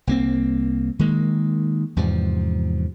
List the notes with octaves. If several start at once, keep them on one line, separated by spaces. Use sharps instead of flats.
C2 A#3 C4
D#3 G#3 A#3
E2 G#2 C3 F3